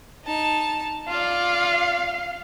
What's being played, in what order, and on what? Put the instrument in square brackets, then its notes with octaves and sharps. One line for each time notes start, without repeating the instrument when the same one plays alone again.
[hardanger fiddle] D#4 A5
[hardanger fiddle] F4 D5 [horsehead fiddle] F5